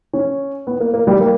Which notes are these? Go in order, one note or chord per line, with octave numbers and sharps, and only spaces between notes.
C#4
B3
A#3
A#3
G3
A#3